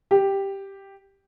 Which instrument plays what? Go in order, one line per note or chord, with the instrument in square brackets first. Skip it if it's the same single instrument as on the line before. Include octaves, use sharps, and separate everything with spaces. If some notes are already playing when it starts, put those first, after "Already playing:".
[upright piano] G4